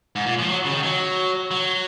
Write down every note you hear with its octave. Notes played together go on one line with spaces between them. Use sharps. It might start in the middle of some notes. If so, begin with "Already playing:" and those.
G#2
A#2
F3
F#3
C#3
D#3
F#3
F#3